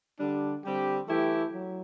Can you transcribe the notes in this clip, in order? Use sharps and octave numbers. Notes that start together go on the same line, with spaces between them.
D3 G3 D4
D3 G3 C4 G4
E3 A3 E4 G4
F#3